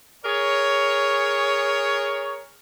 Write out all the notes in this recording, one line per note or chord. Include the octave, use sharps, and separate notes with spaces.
G#4 A#4 C#5